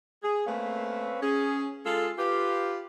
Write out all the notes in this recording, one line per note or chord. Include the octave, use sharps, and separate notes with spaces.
G#4
A3 A#3 C4 C#4 B4 F5
C#4 G#4
G#3 F4 G#4 A4
F4 G4 B4